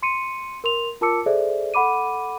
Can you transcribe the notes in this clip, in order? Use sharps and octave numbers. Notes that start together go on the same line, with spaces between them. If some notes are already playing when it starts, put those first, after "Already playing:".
C6 C#7 D#7
A#4 C6 F7
F4 A#4 A5 D6 E6 C#7
G#4 A4 C5 D5 E5
A4 F#5 B5 D6 D#7